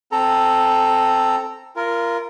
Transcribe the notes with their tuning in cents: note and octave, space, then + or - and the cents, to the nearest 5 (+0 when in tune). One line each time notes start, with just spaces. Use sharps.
C4 +0 A4 +0 A#5 -15
F4 -30 A#4 +0